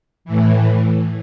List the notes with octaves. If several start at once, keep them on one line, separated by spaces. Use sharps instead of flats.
A2 E3